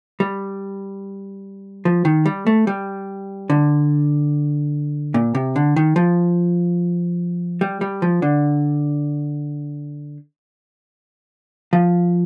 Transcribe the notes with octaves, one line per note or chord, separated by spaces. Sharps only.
G3
F3
D#3
G3
A3
G3
D3
A#2
C3
D3
D#3
F3
G3
G3
F3
D3
F3